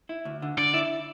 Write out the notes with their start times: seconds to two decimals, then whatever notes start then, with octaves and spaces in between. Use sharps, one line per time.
0.09 E4
0.25 D2
0.42 D3
0.58 D3 D5
0.74 E4